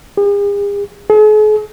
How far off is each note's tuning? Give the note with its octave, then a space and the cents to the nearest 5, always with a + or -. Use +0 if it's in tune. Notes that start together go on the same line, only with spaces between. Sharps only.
G#4 -45
G#4 +45